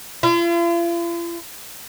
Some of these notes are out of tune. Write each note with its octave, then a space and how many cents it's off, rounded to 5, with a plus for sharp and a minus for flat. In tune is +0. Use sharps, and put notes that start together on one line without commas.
F4 -45